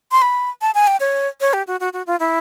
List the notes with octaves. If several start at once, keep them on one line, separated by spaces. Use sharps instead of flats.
C6
B5
A5
G#5
G5
C#5
C#5
G4
F#4
F#4
F#4
F4
E4